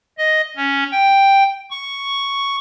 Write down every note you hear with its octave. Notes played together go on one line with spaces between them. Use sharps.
D#5
C#4
G5
C#6